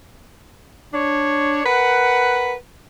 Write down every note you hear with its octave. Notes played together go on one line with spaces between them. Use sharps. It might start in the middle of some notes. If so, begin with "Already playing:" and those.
D4 C#5
A#4 B4 F#5